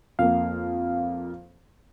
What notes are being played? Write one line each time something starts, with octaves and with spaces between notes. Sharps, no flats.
F2 A#3 F5